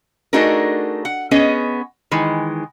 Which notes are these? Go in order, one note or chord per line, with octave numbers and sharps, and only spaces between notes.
A3 D4 D#4 F#4 G#4 A#4
F#5
B3 C#4 G#4 D#5
D#3 E3 G#3